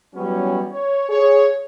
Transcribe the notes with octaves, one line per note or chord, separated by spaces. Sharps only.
E3 F#3 G3 B3 C#4
C#5
G#4 C#5